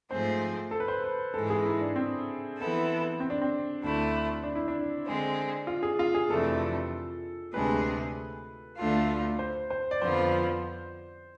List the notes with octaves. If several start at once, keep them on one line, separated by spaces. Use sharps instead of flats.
G#2 F3 A3 C4 G#4 C5
A4
B4
C5
B4
G#2 E3 G#3 A4
G#4
E4
D4
C4
E3 B3 E4 A4
C4
D4
C4
D2 D3 A3 E4
D4
E4
D4
D3 G#3 C4
F4
G#4
F4
G#4
F2 C3 E3 A3 D4 A4
D2 C3 G#3 D4 G#4 B4
D2 D3 A3 D4 F4
C5
C5
D5
F2 D3 F3 B3 F4 C5